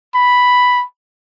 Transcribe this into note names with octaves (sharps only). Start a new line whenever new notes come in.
B5